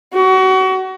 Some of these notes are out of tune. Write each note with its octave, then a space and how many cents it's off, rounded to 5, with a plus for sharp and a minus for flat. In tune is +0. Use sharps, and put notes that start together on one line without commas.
F#4 +30